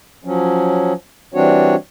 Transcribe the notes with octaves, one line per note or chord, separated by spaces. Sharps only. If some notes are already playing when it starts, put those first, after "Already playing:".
F3 F#3 C#4
E3 G3 C4 D4 F#4 C#5